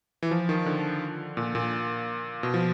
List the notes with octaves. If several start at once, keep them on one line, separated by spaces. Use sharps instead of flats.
E3
F3
D#3
D3
A#2
A#2
B2
F3